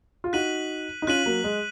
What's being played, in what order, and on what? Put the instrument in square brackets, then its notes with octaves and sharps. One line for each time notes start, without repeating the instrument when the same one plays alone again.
[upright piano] F4
[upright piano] D#4 F#4 [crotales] F#6 B6 D#7 F#7
[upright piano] D#4
[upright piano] C#4 F4 [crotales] F#6 B6 D#7 F#7
[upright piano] F#3 A#3
G#3